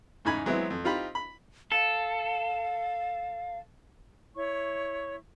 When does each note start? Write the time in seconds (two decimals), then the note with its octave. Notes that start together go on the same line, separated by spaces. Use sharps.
0.25 E2 G#2 C#3 D#4 G#5 B5
0.46 E3 F#3 G#3 B3 C4 E4
0.70 F2
0.84 C4 D#4 F4 G4 B5
1.15 B5
1.72 A4 F5
4.36 E4 C#5 C#6